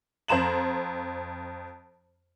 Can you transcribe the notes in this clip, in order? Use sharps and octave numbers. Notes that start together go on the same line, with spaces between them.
F2 C5 A#5 E7 F#7